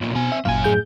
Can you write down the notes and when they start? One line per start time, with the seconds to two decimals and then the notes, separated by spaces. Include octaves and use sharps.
0.01 B1 A#2
0.15 B2 C4 G#5
0.32 E5
0.45 G1 F#2 A#2 F5 G#5
0.64 A2 G#4 G6